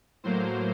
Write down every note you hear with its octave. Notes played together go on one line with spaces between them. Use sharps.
A2 F#3 A#3 C5